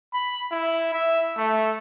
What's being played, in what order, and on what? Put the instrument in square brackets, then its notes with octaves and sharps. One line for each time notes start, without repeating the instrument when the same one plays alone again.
[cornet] B5
E4
E5
A3